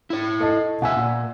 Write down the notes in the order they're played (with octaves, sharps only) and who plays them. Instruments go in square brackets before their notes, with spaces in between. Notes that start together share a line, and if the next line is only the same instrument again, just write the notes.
[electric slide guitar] E4 C#5
[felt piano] A4 D#5 A5
[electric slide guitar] B2 E5 [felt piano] F#5 G#5 E6
[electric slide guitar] A#2